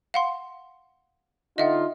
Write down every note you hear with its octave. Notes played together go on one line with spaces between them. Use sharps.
F5 F#5 C6
D3 D#4 F4 D#5 E5 F#5